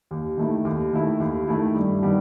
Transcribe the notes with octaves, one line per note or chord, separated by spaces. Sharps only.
D#2
D#3 A3 E4
D#2
D#3 A3 E4
D#2
D#3 A3 E4
G2
D#3 G3 B3